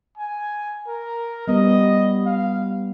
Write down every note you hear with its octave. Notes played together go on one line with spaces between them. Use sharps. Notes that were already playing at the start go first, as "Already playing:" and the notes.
G#5
A#4
G3 B3 D#5
F5